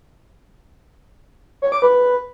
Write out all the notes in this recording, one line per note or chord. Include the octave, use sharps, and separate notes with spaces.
C#5
D6
B4